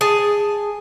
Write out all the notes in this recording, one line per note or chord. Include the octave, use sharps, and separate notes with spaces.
G#4 A5